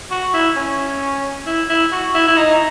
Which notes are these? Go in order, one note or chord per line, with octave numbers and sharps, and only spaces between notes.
F#4
E4
C#4
E4
E4
F#4
E4
E4
D#4